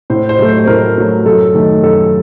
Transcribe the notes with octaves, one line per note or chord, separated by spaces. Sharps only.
A2 C5
C5
F#3 A3
C5
C5
A2 A#4
F#3 A3
F#2 A4
D#3 A3
F#2 A4